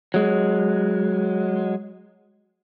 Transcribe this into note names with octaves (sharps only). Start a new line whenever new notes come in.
F#3 G#3